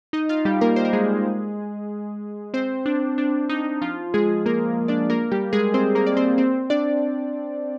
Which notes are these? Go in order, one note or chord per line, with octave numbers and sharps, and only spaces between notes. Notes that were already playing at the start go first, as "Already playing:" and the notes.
D#4 D#5
F4 F5
G3 G4
A#3 A#4
C5
A#4
G#3 G#4
C4 C5
D4
D4
D#4
F3 F4
G#3 G#4
A#3 A#4
D4 D5
A#3 A#4
G3 G4
G#3 G#4
C4 C5
A#3 A#4
D5
C4 C5
C4 C5
D4 D5